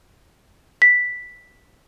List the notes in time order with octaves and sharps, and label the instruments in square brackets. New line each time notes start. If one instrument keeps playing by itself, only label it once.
[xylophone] B6